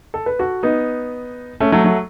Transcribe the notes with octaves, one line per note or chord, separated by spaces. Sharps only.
A4
B4
F#4 A4
B3 D#4
A3 C#4
F#3 A3
F#3 A3